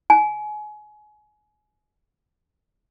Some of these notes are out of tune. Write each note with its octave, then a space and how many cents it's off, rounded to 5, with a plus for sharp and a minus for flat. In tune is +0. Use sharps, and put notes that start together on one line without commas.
G#5 +30